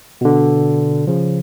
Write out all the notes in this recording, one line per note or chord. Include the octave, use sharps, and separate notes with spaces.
B2 D3
C#3 F3